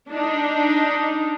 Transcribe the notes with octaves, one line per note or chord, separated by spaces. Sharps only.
D4 D#4